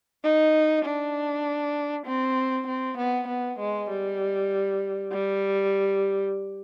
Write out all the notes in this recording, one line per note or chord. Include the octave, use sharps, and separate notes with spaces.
D#4
D4
C4
C4
B3
B3
G#3
G3
G3